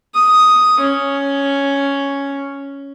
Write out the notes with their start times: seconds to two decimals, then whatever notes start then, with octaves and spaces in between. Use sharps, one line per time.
0.15 D#6
0.80 C#4